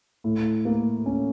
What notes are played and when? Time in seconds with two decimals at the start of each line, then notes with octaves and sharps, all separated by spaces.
0.24 A2
0.65 A#3
1.06 C#4